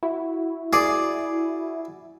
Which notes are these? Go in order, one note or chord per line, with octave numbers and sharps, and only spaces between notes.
E4 F#4
G#4 D5